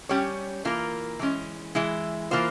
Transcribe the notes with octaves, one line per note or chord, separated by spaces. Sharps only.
G3 C#4 G4 C#5
E3 A#3 F4 A#4
E3 G#3 C#4
E3 G#3 E4
E3 A#3 F4 C5